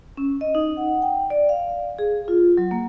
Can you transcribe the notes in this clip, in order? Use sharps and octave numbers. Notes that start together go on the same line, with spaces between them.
C#4
D#5
D#4
F#5
G5
D5
F5
G#4
F4
F#3
A#3